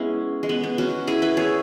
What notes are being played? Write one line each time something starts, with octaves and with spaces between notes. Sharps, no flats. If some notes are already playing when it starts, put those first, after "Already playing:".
Already playing: G#3 B3 C#4 E4
G#3
B3
B3
C#4 F#4
E4 G#4
B4 E5
G#4 C#5